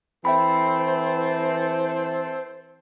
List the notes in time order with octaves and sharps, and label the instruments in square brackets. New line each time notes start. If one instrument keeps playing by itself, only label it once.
[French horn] E3 [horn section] C4 A4 [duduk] C5 [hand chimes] E5 G5 B5